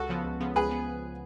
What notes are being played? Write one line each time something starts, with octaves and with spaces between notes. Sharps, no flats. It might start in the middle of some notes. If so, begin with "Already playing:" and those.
Already playing: C#2 F#4 A4
C#3 F3 B3
C#2
C#3 F3 B3
C#2 G#4 B4
B3